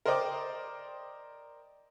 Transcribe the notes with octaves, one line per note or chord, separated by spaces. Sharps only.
A#4 C5 D5 D#5 G5 D6